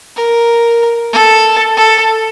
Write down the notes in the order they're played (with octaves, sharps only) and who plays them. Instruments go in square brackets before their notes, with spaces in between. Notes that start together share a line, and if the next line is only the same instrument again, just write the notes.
[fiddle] A#4
A4
A4